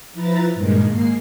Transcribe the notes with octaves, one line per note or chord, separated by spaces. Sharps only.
F3 E4 B4 A#5 A6
G2 A#2 D#3 G3 G#3
G#2 A#3 C7